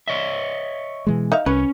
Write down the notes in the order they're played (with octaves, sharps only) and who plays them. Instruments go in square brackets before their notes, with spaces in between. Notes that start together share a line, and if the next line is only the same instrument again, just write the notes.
[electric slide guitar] C#5 D#5 E5
[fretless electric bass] B2 E3 G#3
[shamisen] D#4 E5 F5
[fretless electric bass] C2 [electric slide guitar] C#4 [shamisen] B4